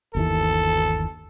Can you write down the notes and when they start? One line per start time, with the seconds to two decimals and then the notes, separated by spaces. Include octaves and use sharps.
0.15 G1 D#2 E3 A4